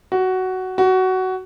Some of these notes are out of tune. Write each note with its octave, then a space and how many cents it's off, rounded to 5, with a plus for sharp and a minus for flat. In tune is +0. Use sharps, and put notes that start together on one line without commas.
F#4 +10
F#4 +15